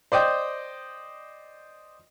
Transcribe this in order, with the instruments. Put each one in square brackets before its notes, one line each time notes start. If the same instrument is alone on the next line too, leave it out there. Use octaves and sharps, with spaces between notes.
[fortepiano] C5 D5 D#5 G5